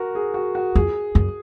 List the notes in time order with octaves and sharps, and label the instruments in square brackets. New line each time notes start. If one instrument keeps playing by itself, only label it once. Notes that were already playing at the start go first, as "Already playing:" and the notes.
Already playing: [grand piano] F#4 A#4
G#4
F#4
F#4
[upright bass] F2 [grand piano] G#4
[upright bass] F#2